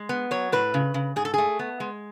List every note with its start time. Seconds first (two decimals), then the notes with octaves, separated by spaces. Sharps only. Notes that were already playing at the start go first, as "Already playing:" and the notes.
Already playing: G#3
0.09 B3
0.31 F#3 C#5
0.52 A2 B4
0.74 C#3
0.94 C#3
1.16 G#2 G#4
1.25 A4
1.34 A3 G#4
1.59 B3
1.80 G#3